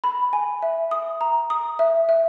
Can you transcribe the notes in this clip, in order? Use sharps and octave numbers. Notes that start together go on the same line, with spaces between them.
B5
G#5
E5
D#6
A#5
D#6
E5
E5